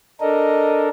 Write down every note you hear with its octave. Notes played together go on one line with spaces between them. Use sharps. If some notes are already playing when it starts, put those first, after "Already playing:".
D4 A4 A#4 D#5